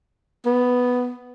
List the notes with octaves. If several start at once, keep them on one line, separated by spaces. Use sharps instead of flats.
B3